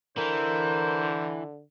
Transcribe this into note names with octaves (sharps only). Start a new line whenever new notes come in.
D3 E3 A#4 C5